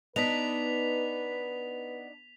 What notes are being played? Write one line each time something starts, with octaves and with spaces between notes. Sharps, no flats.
B3 D4 D#4 B4 B6 F7